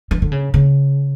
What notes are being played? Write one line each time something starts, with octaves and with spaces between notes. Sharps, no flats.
E3
D3
C#3
C#3